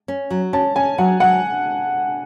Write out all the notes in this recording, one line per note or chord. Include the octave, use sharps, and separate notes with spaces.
C#4
F#3
C#4 A5
C#4 G#5
F#3 F#5
F#3 F#5